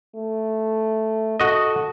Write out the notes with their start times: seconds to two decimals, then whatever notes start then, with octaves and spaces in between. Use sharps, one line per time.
0.16 A3
1.40 F#4 A4 D#5